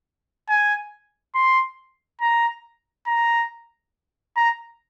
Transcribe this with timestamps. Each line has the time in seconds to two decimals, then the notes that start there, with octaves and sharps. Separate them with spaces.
0.49 G#5
1.35 C6
2.21 A#5
3.07 A#5
4.36 A#5